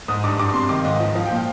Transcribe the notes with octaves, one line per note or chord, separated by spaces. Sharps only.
G#2 D#6
G2 D6
G2 D6
C3 C6
D#3 D6
F5
G#2 D#5
F3
F3 F5
G5
A#2 F5